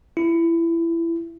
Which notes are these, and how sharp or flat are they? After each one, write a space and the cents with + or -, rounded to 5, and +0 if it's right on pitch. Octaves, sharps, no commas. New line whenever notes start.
E4 +20